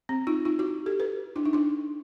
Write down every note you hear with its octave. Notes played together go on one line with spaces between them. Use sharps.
C4
D#4 F4
D#4 F4
E4 F#4
G4 A4
A4 B4
D4 E4
D#4
D4 E4